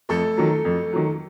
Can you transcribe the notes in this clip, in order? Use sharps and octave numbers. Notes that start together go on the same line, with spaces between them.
F2 A3 A4
D#3 F#3
F2
D#3 F#3